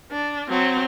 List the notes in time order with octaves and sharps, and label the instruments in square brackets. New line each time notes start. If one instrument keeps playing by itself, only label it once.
[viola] D4
F#3 C4